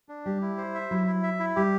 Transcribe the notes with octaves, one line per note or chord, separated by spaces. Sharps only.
D4
G3 G4
E4
C5
E5
F#3 E4
E4
E5
E4
G3 G4